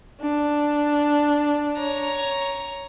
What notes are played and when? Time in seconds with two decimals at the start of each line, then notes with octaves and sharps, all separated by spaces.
0.21 D4
1.77 C#5 A#5